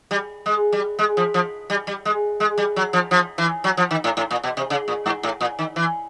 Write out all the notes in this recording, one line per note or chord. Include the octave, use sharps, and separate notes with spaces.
G3
G#3
G3
G#3
F3
F3
G3
G3
G#3
G#3
G3
F#3
F3
F3
E3
F#3
F3
D#3
A2
A2
A#2
B2
C3
C#3
A#2
G#2
A2
A#2
D#3
E3